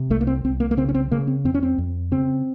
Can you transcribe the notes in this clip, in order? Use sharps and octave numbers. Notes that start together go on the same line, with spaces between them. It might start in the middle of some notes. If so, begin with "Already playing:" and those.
Already playing: C3
C2 A3
A#3
C4
C2 C4
A#3
A#3
C#3 C4
C#4
C4
C#3 A#3
C4
F2 C4
C#4
C4
F2
C#3 C4